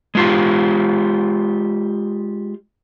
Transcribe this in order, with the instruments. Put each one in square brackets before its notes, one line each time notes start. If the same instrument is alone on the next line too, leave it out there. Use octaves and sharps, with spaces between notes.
[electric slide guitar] G#3 F4 G4